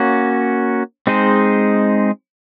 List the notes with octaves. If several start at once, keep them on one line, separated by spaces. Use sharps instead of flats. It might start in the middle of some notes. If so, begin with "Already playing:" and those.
Already playing: A#3 C#4 F#4
G#3 C4 D#4 G#4 C5